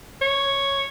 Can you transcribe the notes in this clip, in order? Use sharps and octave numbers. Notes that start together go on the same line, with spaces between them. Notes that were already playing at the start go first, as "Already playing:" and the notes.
C#5